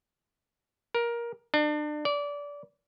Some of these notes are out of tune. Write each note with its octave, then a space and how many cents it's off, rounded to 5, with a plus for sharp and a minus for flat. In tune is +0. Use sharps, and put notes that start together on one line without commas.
A#4 +15
D4 +35
D5 -25